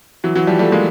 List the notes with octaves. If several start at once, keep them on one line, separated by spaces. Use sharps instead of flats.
E3 F#3
E3 F#3
F3 G3
G3 A3
G#3 A#3